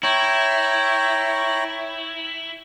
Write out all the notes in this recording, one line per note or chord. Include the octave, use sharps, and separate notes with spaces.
E4 C#5 G5 A#5